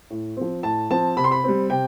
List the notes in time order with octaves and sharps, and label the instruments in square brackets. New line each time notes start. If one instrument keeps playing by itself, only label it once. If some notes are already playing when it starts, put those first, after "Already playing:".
[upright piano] A2
F3 C4
A2 A5
F3 C4 A5
C3 B5
C6
B5
G3 C4
C3 G5